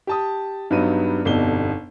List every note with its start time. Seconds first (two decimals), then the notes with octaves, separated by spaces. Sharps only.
0.07 G4 A5 D#6
0.71 G2 F#3 G3 B3 D#4 D#7
1.25 G1 F2 B2 G3 D#4 G7